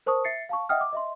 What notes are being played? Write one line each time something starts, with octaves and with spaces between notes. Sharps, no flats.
A#4 C5 A5 C#6 D#6
E5 A6 C7 C#7
F5 A5 C#6
D#5 E5 F#5 G5 D#6 F6
D6
D#5 E5 C6